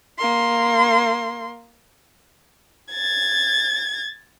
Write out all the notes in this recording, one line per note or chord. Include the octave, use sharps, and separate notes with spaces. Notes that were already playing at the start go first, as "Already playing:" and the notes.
A#3 C6
G#6 A6